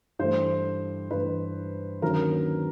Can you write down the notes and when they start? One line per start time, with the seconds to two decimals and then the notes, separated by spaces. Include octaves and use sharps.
0.19 G2 E3 A3 C5
1.11 G2 E3 A3 B4
2.02 D#2 D3 F#3 A#3 C#4 A#4